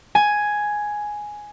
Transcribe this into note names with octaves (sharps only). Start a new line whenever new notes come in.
G#5